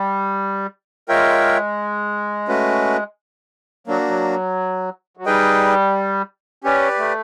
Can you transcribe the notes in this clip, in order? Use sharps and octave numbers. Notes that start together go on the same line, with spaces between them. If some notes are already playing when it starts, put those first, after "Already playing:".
Already playing: G3
G#3 F4 A#4 C#5 E5 G5
A3 C#4 F#4 B4
F#3 A#3 D4 F#4
F#3
F#3
G3 D#4 G#4 B4 D#5 G5
C#4 G4 B4 D5
A3